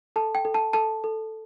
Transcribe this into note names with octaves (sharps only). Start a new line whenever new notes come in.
A4 A5
G5
A4
A5
A4 A5
A4